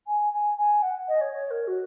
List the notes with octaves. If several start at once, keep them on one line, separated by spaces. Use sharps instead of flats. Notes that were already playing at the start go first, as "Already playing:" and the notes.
G#5
G#5
G#5
F#5
D#5
C#5
C#5
A#4
F#4